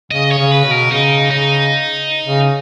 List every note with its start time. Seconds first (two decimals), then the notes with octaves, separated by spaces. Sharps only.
0.11 C#3 D#5
0.31 C#5
0.38 C#3
0.51 B4
0.65 B2
0.71 A#4
0.91 C#3 D#4
1.31 C#3 D#4
2.24 C#3